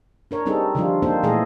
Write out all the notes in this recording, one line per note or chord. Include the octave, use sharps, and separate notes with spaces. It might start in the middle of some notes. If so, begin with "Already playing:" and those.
D4 A#4 C#5
G3 C4 D4 D#4 G#4 A4
D3 D#3 F3 G3 D4 F4
A#3 C4 D#4 F4 A4 C5
A#2 E3 A3 G#4 A4 D#5